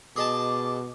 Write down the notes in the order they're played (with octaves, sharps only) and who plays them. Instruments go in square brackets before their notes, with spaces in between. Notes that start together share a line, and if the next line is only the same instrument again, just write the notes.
[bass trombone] B2 [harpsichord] G#4 D#5 A5 [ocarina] D6